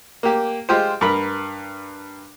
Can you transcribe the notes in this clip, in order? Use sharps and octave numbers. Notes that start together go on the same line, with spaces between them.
A#3 G4
G#3 F4 G4 C5
G2 A#4 B5